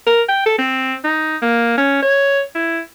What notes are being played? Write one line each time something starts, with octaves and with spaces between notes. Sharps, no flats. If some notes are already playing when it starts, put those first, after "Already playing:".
A#4
G5
A4
C4
D#4
A#3
C#4
C#5
E4